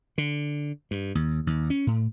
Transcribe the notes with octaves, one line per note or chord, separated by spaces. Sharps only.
D3
G2
D#2
D#2
C#4
A2